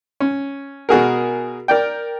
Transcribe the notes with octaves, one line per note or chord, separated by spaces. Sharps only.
C#4
B2 F#4 G#4 A#4
A#4 D5 G5